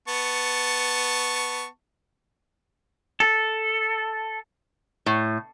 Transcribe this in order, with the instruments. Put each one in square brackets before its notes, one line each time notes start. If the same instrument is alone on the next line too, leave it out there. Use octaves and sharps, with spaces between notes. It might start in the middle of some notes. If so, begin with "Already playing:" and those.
[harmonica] B3 A5 C#6
[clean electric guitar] A4
[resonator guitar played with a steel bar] A2